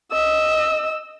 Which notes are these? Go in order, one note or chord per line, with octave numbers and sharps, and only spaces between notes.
D#5 E6